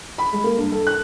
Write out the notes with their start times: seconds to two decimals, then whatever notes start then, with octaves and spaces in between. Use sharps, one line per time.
0.18 B5
0.33 G#3
0.44 A#3
0.57 G2
0.72 A4
0.87 F#6